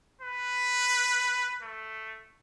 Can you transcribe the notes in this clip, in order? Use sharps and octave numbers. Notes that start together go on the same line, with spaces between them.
B4
A3